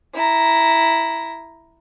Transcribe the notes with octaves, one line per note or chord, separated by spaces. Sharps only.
E4 A#5